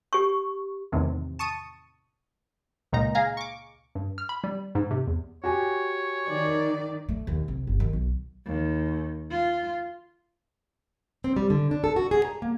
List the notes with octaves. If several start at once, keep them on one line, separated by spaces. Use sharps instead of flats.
G4 C#6
E2 A2 C3 D#3
A5 C#6 D#6
C#2 A#2 D#4 A#5
G#4 F5 A#5
C#6 D6
G2
F6
B5
G3
G#2
C3
E2
F#4 G4 C#5 G#5
D#3 D5
A3
D#2
C2
G1
D#3
B1
D#2
F4
C4
G3
D3
D4
A4
F#4
G#4
A#5
A#3